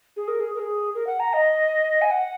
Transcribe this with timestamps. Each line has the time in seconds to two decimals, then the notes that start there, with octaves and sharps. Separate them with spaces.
0.17 G#4
0.28 A#4
0.40 G#4
0.55 A#4
0.60 G#4
0.95 A#4
1.07 F#5
1.20 A#5
1.33 D#5
2.01 G#5
2.11 F#5